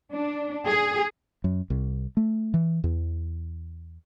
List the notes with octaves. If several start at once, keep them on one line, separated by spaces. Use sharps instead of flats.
D4
G#4
F#2
C2
A3
E3
E2